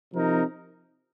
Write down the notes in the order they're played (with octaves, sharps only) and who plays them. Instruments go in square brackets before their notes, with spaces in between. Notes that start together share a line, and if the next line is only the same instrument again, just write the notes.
[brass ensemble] C3 F3 C4 D#4 A#4